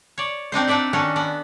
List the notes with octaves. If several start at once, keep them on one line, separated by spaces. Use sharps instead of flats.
C#5 D5
C4 D4 D#4 C5
D4 D#4 D5 E5 F#5
D#3 C#4 D4 F#4 A4
B3 D4